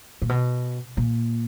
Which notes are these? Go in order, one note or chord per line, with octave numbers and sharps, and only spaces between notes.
A#2
B2
A#2